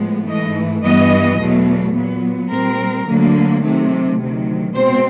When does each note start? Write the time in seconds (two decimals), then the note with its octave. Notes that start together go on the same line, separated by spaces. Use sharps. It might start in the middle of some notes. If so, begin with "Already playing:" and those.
Already playing: A2 F3 G#3 B3
0.27 G#2 E3 A3 D#5
0.83 G2 E3 G3 B3 D#5
1.39 E2 B2 F#3 A3
1.95 A#2 F#3 B3
2.51 A#2 G3 C4 A#4
3.07 D2 D3 F#3 A#3
3.63 C3 D#3 F#3 A3
4.19 D2 C3 D#3 F#3
4.74 B2 G#3 C4 C5